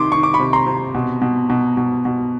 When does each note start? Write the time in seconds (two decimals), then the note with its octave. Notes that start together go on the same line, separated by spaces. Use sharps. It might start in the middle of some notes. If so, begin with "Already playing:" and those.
Already playing: C3 D#3 C6 D6
0.12 D#3 C#6
0.23 D6
0.34 B5 C#6
0.40 C3
0.53 A#5 C6
0.66 C3
0.95 B2
1.22 B2
1.50 B2
1.77 B2
2.05 B2